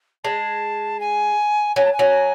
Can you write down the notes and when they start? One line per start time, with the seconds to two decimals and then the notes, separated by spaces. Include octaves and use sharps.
0.24 G#3 A5
1.00 G#5
1.76 F#3 G#5
1.85 A5
1.93 G#5
1.99 F#3